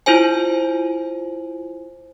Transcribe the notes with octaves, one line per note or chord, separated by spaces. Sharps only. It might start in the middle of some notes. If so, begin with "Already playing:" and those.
E4 F4 C5 G#5